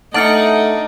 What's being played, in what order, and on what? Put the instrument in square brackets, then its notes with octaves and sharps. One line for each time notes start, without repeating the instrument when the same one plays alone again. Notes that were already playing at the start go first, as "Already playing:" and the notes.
[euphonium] A3 [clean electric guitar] D4 D5 [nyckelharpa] D#4 [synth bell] F#5 F6 C#7